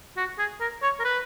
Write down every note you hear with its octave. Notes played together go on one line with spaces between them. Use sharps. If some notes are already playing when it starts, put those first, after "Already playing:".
F#4
G#4
A#4
C#5
A#4
B4